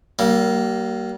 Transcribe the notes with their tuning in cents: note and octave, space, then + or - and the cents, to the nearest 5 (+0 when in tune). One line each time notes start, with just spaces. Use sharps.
G3 -40 A#3 +0